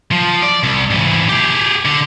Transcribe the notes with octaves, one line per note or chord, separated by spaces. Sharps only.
F3
D5
C2
G#2 E3
G4 G#4
D3